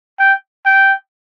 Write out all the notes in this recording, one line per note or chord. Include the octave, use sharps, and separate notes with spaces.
G5
G5